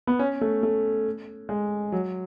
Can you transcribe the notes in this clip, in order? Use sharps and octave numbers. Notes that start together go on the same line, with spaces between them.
B3
C#4
A3
A3
G#3
F#3